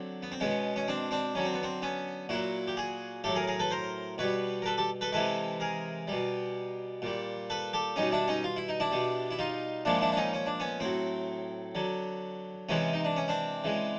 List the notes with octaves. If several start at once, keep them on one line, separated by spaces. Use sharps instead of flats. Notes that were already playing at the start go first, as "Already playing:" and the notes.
Already playing: D3 F#3 C4
B3
C4
B2 G#3 B3 C#4
C#4
C4 D4
C4 D4
D3 F#3 C#4
C4
B3
C4
B3 C#4
A#2 F#3 E4 F#4
G4
F#4 G#4
A2 F#3 G4 A4
G#4 A#4
G#4 A#4
A4 B4
A#4 C5
B2 G3 B4 C#5
A#4
A4 B4
G4 A4
A4 B4
C3 E3 G#3 A4 B4
G#4 A#4
B2 G3
A#2 G3
A4 B4
G4 A4
B2 G3 C#4 D#4
D4 E4
C#4 D#4
F4
E4
D#4
D4 E4
B2 G3
E4
D#4 F4
A#2 F3 G#3 D4 E4
D4 E4
D4
C#4 D#4
C#4
D4
B3 C#4
A2 F#3 C4
D3 F#3
C3 E3 G#3 B3 C#4
D#4
D4
C#4
C4 D4
C#3 E3 G#3